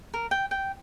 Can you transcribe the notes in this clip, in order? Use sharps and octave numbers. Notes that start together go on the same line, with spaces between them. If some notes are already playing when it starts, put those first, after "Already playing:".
A#4
G5
G5